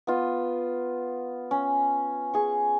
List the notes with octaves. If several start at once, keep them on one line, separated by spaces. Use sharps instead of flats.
B3 F4
C#4
G#4 C#6